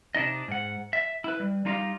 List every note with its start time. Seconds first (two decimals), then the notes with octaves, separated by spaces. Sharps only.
0.15 C3 D4 D#4 D#5
0.48 G#2 F#5
0.93 E5
1.24 E4 B4
1.40 G3
1.65 G3 D#4 F4 G4 D#5 F5